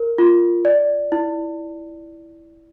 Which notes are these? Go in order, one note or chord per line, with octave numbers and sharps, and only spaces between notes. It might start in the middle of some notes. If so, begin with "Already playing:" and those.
Already playing: A#4
F4
D5
E4